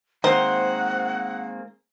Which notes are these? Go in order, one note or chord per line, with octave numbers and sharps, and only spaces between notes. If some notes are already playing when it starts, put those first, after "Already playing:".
D#3 G#3 A#3 C4 C5 F#5